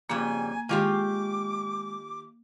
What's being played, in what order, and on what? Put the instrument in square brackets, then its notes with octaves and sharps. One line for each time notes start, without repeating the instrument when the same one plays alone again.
[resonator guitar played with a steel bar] F2 C#3 G3 [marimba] A#3 [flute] G#5
[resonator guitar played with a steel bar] D#3 F4 G4 [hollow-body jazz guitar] G#3 G#5 [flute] D6